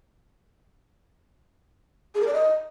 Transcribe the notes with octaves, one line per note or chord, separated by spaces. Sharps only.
G#4
A#4
D5
D#5